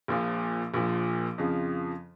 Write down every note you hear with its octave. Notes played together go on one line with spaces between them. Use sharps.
A#1 A#2 F3
A#1 A#2 F3
F2 C#3 F3